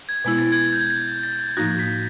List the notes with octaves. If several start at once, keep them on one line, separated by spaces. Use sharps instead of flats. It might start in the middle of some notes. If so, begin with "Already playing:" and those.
G#6
B2 G#3 B3 E4 G#6
A6
G#6
G6
G#6
A6
A6
A2 F3 A#3 D#4 F#4 A#6
B6